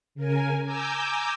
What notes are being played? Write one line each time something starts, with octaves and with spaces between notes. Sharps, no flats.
C#3 A#4 G#5
G#5 A#5 D6 E6 G6